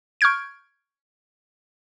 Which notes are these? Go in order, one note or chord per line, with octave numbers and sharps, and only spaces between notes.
C#6 F6 G6 G#6 D7